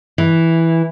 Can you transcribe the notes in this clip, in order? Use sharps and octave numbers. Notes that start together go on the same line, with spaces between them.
E3